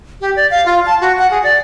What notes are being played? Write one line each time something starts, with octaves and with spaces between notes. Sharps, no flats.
G4
D5
F5
F4
A5
F#4
F#5
G#4
D5